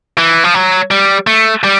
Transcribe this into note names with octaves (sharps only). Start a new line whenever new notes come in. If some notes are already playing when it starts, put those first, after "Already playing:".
E3
F3
F#3
G3
A3
G3